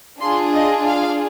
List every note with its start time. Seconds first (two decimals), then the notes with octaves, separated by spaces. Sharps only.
0.21 D4 F4 G#4 C6
0.54 D#5
0.86 F5